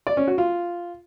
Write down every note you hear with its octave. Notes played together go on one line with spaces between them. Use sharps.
D5
C#4
F#4
F4